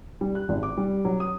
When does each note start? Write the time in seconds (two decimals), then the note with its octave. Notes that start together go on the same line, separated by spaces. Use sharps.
0.21 G3
0.35 F#6
0.49 G#1
0.63 D6
0.77 G3
1.05 F#3
1.20 D#6